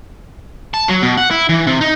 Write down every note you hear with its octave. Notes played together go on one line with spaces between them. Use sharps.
A5
F#3
B2
F#5
E4
E3
C3
D#4